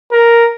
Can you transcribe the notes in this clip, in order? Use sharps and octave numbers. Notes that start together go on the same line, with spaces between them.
A#4